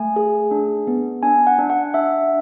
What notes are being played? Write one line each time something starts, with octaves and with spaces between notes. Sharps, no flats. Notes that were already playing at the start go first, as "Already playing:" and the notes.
Already playing: A3 G#5
G#4
D4
B3
D4 G#5
F#5
D4
F#5
D4 E5